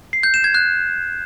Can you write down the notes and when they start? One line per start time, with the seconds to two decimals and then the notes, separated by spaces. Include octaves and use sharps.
0.13 C7
0.23 G6
0.34 E7
0.44 G#6
0.55 F#6